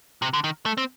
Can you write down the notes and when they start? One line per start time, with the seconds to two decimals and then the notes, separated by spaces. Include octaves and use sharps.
0.22 C3
0.33 D3
0.44 D#3
0.66 A3
0.78 C4